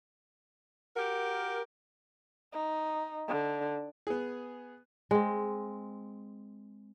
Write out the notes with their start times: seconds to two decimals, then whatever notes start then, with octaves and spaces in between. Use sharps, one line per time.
0.96 F#4 G4 A#4
2.53 D#4
3.28 D3
4.07 B3 G#4
5.11 G#3 C4